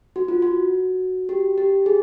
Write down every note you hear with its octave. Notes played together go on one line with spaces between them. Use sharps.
F#4
F4
F#4
G4
G4
G#4